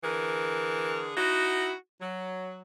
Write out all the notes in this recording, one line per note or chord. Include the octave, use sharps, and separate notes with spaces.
D3 E3 G#4 A#4
D#4 E4 F#4
F#3